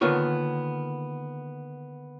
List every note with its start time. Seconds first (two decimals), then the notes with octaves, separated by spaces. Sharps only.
0.01 D3 D#3 A#3 B3 F4 C#5